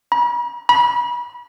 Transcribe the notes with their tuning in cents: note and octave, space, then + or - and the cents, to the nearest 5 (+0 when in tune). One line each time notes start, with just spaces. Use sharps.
B5 -45
B5 -35